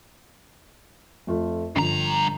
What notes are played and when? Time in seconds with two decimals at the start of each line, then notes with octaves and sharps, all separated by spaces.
1.27 F2 A3 F4
1.76 G1 G2 F3 A#5